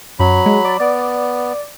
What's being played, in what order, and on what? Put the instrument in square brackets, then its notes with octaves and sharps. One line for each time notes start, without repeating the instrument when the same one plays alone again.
[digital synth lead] F#2 [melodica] F#3 B5
[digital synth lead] G#3
D5
[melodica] B3 [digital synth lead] D5